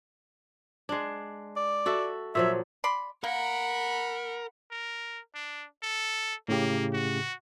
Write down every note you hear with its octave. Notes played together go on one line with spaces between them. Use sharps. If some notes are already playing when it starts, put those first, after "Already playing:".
G#3 D4
D5
F#4 A4 E5
A#2 F3 F#3 E5
D5 B5 C6
A#3 A#4 F#5 B5
A#4
D4
A4
A2 C#3 A#3 G4
F#4